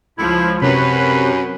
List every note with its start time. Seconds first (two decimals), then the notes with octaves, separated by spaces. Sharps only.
0.18 C#2 F3 E4
0.62 F#2 C3 B4 C#5 B5